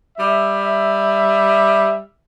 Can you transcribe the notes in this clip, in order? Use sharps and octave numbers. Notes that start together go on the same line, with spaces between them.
G3 E5